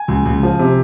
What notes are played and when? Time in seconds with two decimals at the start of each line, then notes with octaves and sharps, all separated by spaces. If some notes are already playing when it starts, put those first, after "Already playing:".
Already playing: G#5
0.08 C#2
0.25 C#2
0.43 F3
0.59 C3